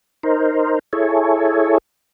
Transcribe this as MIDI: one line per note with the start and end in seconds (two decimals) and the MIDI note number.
0.23 0.79 63
0.23 0.79 70
0.23 0.79 72
0.93 1.78 64
0.93 1.78 68
0.93 1.78 69
0.93 1.78 73